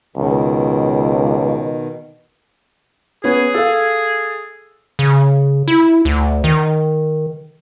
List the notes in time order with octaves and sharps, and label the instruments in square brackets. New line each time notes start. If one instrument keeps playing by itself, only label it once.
[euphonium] C#2 [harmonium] B2 D#3
[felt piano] B3 C#4 [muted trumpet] G#4
[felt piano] A4 F5
[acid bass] C#3
E4
D2
D#3